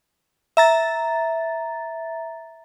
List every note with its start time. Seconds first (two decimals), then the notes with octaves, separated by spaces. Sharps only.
0.57 E5 A#5 A6